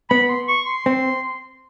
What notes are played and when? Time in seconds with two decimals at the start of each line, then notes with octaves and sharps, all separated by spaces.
0.10 B3 B5
0.29 C6
0.48 C#6
0.66 C6
0.86 C4